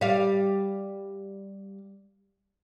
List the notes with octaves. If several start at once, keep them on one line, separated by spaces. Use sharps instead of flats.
G3 F5